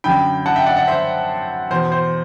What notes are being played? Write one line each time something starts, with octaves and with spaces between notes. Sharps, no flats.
F#2 D3 G5 B5
F#5 A5
E5 G5
D5 F#5
D5 F#5
C5 E5
E2 B2 C5
C5